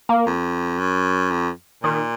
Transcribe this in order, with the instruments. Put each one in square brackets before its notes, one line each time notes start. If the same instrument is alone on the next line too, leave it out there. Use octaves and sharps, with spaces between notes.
[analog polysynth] A#3
[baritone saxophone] F2
F#2
F2
[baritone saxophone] A#2 [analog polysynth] D#3